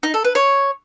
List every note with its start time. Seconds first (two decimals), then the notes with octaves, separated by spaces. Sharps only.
0.03 D#4
0.14 A4
0.25 B4
0.35 C#5